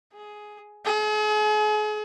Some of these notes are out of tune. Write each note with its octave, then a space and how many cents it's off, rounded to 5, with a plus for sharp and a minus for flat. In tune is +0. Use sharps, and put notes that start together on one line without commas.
G#4 +10
G#4 +40